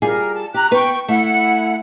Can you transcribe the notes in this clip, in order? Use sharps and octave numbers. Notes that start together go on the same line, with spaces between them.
G3 F4 G#4 A#4
A5
G4 A#5 F#6
B3 B4 G5 C#6
A3 E4 F#5